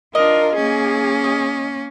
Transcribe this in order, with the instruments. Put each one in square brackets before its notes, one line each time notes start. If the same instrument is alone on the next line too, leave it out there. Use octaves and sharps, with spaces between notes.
[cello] D4 F4 [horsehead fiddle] A#4 [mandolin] D#5
[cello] A#3 C#4 [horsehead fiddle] G#4
[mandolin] D#5